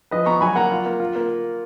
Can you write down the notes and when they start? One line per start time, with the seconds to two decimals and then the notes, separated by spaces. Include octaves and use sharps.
0.11 F3 B4 D#5
0.26 B3 A#5 C#6
0.41 F#3 G#5 B5
0.56 A#3 F#5 A#5
0.71 F4
0.86 A#3
1.00 F4
1.16 A#3